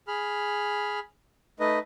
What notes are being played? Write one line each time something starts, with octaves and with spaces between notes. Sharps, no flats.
G#4 B5 F6
A3 D#4 B4 D#5